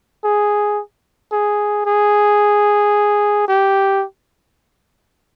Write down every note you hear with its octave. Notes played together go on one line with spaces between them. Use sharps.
G#4
G#4
G#4
G4